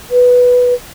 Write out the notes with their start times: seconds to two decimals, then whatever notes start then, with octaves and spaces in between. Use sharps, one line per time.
0.11 B4